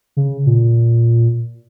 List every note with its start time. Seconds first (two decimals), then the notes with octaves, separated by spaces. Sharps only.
0.17 C#3
0.46 A#2